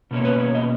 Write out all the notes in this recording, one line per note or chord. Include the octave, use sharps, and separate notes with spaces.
B2 A#3 C#4 C#5
B4
C#5
D#5